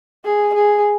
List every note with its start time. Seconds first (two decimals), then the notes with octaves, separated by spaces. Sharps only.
0.24 G#4
0.54 G#4